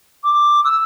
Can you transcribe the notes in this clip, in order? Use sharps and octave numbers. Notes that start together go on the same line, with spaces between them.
D6
E6